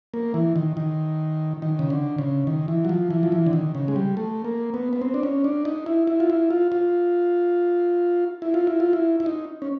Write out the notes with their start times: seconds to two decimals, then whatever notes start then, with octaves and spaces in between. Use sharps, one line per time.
0.14 A#3
0.34 E3
0.56 D#3
0.77 D#3
1.62 D#3
1.79 C#3
1.90 D3
2.18 C#3
2.47 D#3
2.68 E3
2.85 F#3
2.89 F3
3.10 E3
3.23 F3
3.32 E3
3.46 D3
3.53 D#3
3.75 C#3
3.88 G#3
3.96 G3
4.17 A3
4.45 A#3
4.74 B3
4.93 B3
5.02 C4
5.14 D4
5.23 C#4
5.44 D4
5.65 D#4
5.86 E4
6.07 E4
6.20 F4
6.30 E4
6.50 F4
6.72 F4
8.42 E4
8.54 F4
8.67 E4
8.80 F4
8.93 E4
9.20 E4
9.26 D#4
9.62 C#4